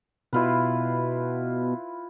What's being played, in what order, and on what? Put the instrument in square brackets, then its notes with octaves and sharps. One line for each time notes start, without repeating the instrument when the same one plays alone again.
[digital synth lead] B2 [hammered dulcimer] E4 F4 B4